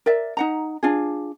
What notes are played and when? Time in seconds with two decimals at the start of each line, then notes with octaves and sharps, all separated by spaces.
0.06 A#4 D5 E5
0.37 D#4 F#5 A#5
0.83 D4 F4 G#4